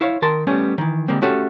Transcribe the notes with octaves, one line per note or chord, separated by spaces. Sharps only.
E4 C5 C#5 F5
D#3 A#4 A5 C6
G3 A3 B3 C#4
D#3 E3
D3 G3 G#3 A#3 C4
A3 C#4 F#4 G4 A4